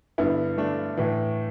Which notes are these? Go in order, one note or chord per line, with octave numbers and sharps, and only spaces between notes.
G2 D3 B3 E4
A3 D4
A2 E3